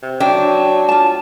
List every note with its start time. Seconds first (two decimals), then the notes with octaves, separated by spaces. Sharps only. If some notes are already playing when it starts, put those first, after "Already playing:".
0.03 C3
0.20 F#3 D4 G5
0.89 F4 A5